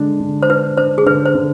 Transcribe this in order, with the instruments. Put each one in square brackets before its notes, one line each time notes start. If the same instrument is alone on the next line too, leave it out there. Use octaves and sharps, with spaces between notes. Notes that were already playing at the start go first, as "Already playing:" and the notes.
Already playing: [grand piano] D3 G#3 D4
D3
[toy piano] C5
[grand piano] D4 [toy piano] B4
[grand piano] D4 [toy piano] C5
[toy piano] G#4
[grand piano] D3 [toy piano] B4
[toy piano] C5
[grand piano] D3